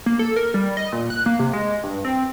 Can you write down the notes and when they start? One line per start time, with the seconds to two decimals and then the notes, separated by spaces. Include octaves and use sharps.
0.06 A#3
0.19 A4
0.36 A#4
0.54 G3
0.77 D#5
0.93 A#2
1.10 F#6
1.26 A#3
1.39 C3
1.53 G#3
1.84 G2
2.05 C4